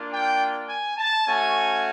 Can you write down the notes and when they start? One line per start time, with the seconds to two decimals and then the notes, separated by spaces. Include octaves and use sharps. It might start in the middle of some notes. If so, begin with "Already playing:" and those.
Already playing: A#3 D4 F4
0.11 G5
0.68 G#5
0.97 A5
1.26 A3 C#4 F#4 G#5